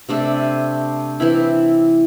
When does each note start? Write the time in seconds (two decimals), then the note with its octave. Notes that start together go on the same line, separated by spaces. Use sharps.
0.09 C3 A3 D4 A4
1.20 E3 C4 E4